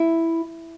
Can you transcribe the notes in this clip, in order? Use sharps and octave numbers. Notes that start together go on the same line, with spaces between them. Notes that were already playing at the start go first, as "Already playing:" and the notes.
Already playing: E4